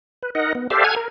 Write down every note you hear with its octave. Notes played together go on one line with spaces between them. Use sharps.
B4
D#4 A#4 D#5 F#5
B3
G4 A4 C5 D5 E5 F5
A4 F#5 G#5 F6 G#6
A#4